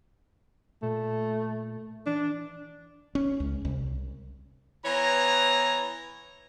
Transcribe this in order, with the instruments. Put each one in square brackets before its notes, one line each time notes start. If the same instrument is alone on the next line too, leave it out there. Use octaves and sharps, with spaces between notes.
[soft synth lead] A#2 [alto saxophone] A3
[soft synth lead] E3 [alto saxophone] D4
[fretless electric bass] C#4
C#2
C2
[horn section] E3 B3 C#5 A#5